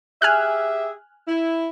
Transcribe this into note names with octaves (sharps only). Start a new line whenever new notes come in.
G4 G#4 E5 G#5 F6 F#6
E4